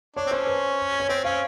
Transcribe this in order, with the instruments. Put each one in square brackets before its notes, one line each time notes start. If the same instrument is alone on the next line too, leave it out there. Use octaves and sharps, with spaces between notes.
[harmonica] D4 [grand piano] C#5
[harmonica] C4
[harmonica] C#4 [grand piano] C5
[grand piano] B4
C#5
[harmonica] C4 [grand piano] C5
[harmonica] C#4 [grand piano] F5